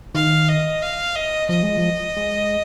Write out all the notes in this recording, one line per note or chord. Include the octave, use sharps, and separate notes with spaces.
D#3 F5
D#5
F5
D#5
F3 D#5
G#3
F3
G#3